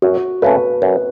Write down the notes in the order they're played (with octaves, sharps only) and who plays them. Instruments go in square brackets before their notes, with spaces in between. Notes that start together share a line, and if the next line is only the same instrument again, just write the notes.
[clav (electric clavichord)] F#2 [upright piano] F#4
[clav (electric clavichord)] C#3 A3 C#4 [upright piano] B4
[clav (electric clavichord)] F#2